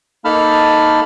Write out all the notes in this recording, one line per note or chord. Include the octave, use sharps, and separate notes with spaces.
A#3 D#4 A4 A5 B5 F6